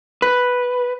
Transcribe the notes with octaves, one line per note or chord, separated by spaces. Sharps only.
B4